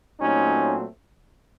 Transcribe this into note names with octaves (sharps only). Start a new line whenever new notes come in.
A#2 F#3 A3 C4 C#4 D#4